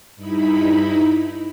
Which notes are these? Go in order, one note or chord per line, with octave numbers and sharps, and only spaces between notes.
G2 D#4 E4 B5